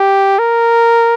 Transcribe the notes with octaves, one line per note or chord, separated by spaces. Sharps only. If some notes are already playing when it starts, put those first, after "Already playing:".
Already playing: G4
A#4